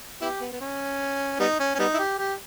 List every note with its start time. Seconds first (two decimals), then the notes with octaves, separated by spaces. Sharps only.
0.21 B3 E4 G4
0.41 B3
0.52 B3
0.61 C#4
1.40 G3 B3 D#4
1.60 C#4
1.74 C#4
1.79 G3 B3 D#4
1.94 E4
1.99 G4
2.18 G4